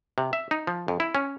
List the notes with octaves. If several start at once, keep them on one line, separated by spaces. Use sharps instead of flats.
C3
E5
D#4
F3
F2
E4
C#4